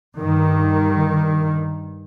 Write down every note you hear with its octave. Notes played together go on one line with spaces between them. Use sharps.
G2 D#3